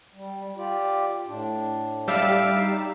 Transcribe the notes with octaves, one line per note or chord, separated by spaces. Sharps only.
G3
F4 G4 D5
A2 D4
G3 E5 F5 D6 E6
D#4